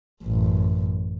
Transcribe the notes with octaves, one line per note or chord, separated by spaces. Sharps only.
A1 F#2